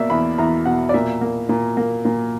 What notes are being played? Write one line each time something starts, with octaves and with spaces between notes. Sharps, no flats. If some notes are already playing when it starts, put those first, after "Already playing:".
Already playing: B2 A#3 D5 E5
E2 B5
E2 A#5
B2 F#5
D5
A#2 E5
A#3
A#2
A#3
A#2